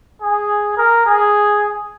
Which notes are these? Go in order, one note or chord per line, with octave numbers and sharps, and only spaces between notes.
G#4
A#4
G#4